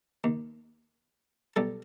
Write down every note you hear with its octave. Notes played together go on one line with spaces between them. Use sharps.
D#2
B1 G3 A4